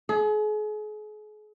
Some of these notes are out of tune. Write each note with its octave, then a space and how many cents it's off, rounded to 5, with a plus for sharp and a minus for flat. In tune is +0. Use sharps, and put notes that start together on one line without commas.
G#4 +40